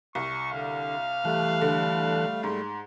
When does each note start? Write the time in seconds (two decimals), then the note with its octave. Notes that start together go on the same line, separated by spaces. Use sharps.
0.15 C2 C#6
0.52 D3 F5
1.25 E3 G3 A3 A5 F#6
1.61 D3
2.43 G#2 C6